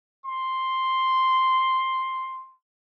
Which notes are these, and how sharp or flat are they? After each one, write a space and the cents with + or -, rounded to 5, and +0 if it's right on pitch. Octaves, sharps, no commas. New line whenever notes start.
C6 +5